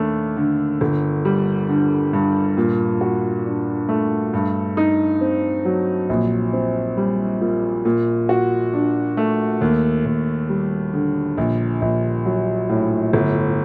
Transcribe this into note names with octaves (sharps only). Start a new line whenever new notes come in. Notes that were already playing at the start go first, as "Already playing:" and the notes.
Already playing: D#2 A3 D4
D3
G1
G3
D3
G2
A#2
F#4
D4
A3
G2
D#4
C4
F#3
A#1
C4
G3
A#2
A#2
F#4
D4
A3
D#2
D#2
G3
D3
A#1
A#1
F#3
A2
G1